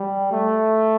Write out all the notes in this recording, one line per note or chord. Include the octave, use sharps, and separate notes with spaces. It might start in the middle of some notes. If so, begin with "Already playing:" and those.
Already playing: G3
A3